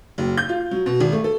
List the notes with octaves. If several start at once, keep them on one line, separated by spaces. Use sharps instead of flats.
F#1
G6
F4
F#3
B2
G#1
A3
A4